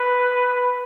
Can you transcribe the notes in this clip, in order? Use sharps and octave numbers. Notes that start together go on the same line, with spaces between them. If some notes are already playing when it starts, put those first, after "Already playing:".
Already playing: B4